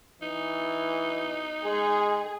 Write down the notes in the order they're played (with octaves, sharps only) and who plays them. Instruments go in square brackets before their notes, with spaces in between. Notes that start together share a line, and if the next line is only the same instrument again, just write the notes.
[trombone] E3 [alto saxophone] D#4
[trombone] G#3 [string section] G#4